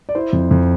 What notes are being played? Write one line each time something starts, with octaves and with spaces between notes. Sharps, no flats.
D5
E4 C5
F2
F2